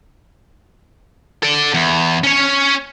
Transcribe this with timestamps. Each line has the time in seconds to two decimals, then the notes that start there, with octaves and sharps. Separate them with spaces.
1.43 A4 D5
1.74 E2
2.24 C#4 C#5